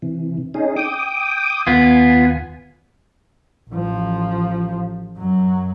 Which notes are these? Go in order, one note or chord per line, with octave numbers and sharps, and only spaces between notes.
C3 E3
C#4 D#4 G#4
G5 D6 D#6
D#2 B3 F4 G#5
A1 F3
F#2 F#3